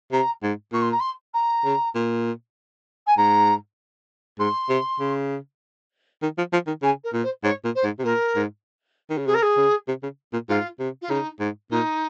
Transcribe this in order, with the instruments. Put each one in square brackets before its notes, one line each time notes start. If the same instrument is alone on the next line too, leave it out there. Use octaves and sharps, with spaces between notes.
[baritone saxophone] C3 [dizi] A#5
[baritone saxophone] G#2
[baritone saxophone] A#2 [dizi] C#6
[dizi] C6
A#5
C6
A#5
[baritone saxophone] C#3
A#2
[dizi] G#5
[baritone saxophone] G#2 [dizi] A#5
[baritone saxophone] G#2 [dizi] C6
[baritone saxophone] C3
C#3
D#3
F3
F3
D#3
[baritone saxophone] C#3 [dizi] G#5
[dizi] A#4
[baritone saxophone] A#2
[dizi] C5
[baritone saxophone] G#2 [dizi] C#5
[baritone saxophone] A#2
[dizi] C5
[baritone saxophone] G#2
C3
[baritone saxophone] A#2 [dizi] A#4
[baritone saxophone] G#2
D#3
C#3
[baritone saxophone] C3 [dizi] G#4
[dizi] A#4
G#4
[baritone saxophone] C#3
C3
C#3
A#2
[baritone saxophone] G#2 [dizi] F4
[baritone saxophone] C3
[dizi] F4
[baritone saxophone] C#3 [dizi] D#4
[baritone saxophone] G#2
[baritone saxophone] A#2 [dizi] D#4